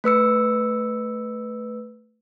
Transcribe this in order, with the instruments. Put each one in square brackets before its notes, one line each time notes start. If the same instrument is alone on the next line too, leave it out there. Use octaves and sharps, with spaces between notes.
[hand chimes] A3 B4 E6 C#7